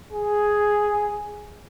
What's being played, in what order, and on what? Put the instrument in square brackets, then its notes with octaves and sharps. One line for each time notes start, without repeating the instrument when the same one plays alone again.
[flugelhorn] G#4